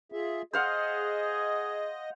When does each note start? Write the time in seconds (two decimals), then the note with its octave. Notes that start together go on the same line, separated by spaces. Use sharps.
0.12 F4 G#4 E5
0.53 G#4 C5 D#5 F5 F#5